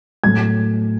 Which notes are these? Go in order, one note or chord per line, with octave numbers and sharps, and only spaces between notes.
A2 F#3 A3 G#6